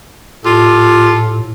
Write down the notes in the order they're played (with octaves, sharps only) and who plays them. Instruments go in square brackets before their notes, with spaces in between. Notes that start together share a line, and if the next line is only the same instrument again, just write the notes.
[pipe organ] A2 [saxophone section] F4 G4 A4